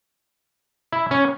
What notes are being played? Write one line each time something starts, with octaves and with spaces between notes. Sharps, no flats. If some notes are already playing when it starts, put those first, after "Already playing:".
E4
C#4